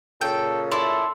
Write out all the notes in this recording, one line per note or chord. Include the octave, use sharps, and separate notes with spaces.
A#2 C#3 A4 G5
E4 A4 D5 C6 E6